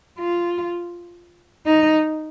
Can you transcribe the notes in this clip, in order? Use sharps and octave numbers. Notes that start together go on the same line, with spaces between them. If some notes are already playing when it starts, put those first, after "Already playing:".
F4
D#4